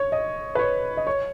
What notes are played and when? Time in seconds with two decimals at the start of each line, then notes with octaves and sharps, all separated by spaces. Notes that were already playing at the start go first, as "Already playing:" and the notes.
Already playing: C#5
0.12 D#5
0.55 B4
0.59 C#5
0.97 D#5
1.07 C#5